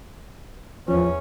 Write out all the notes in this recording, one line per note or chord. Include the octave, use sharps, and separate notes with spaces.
E2 F3 C#4